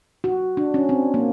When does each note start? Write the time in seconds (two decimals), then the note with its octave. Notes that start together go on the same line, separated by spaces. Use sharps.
0.24 F#4
0.57 D4
0.74 C#4
0.89 C4
1.14 A#3